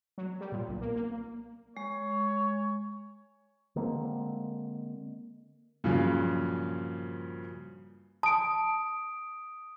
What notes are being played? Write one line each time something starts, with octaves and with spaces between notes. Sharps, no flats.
F#3
G3
A#2
B1
A#3
A#3
G#3 C#5
D3 G#3 A#3 C4
G2 A#2 C#3 F3 F#3
A5 D#6 D7